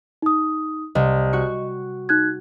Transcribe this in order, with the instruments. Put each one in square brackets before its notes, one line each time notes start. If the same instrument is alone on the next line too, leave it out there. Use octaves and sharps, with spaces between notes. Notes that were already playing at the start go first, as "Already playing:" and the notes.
[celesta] D#4 D#6
[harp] C2 [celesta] D#5
[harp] F#4 C#6
[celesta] D#4 F#6 G#6